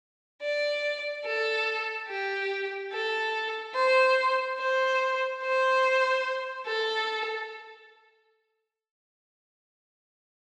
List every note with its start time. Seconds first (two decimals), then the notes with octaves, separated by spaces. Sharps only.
0.42 D5
1.25 A4
2.09 G4
2.92 A4
3.75 C5
4.59 C5
5.42 C5
6.67 A4